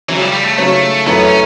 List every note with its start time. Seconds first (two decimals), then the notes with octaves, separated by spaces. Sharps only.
0.09 C#3 E3 F#3 C#4
0.21 G3
0.33 G3
0.45 A3
0.58 C#3 F#3 A3 C#4
1.06 F#2 E3 A3 B3
1.23 C#4